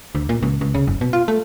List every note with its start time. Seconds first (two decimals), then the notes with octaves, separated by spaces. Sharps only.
0.15 D2
0.29 A#2
0.43 C#2
0.61 C#2
0.74 C#3
0.87 F#1
1.01 B2
1.13 F4
1.28 A3